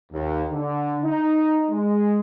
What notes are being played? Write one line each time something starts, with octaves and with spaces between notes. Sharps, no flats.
D#2
D3
D#4
G#3